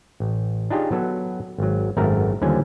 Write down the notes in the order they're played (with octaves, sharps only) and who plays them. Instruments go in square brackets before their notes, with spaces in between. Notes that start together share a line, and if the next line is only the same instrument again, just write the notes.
[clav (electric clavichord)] A1
D4 D#4 F4 G4 G#4 C#5
F#3 B3 A4
G#1 F#3
G#1 F#2 A3 A#4 A#5
D#2 D3 F3 G3 C#4 G#5